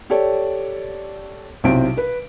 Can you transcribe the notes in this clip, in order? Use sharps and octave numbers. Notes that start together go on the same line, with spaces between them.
G4 A4 C#5 D5
B1 C3 C4 E4 D7
B4